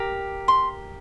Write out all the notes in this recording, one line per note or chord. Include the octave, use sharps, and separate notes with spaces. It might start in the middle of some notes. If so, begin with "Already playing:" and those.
Already playing: G4 A#4 D6
C6